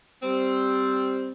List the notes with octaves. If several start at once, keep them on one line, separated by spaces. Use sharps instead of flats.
G3 C4